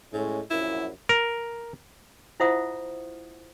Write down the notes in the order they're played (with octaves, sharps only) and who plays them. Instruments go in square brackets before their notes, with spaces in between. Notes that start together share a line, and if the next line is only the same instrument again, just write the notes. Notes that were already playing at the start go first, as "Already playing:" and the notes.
[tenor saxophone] A2 [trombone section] G#3 C#4
[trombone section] A#1 F#2 [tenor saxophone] E4
[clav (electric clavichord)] A#4
[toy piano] E4 F4 C5 E5 F#5 D#6